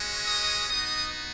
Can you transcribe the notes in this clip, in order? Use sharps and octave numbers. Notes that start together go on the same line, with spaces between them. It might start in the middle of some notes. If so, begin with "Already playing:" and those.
Already playing: G#3 C#4 F#4
D#5 D#6
B3 D#4 F#4 D#5 D#6